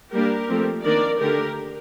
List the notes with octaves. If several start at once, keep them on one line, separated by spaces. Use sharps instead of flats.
G3 A#3 D4 G4 A#4
F3 A3 C4
D#3 A#3 D4 A#4 D5
D3 A3 D4 G4 A#4